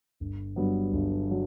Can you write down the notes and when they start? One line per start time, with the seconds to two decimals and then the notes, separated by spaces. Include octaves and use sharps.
0.20 G1
0.56 G2 F#3 B3
0.93 G1
1.31 F#3